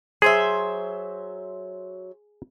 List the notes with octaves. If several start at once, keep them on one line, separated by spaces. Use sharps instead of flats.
F#3 G#4 C5 E5